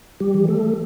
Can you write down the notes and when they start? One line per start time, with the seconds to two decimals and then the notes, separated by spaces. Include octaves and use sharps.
0.20 G3 G4
0.34 E3
0.48 A3 A4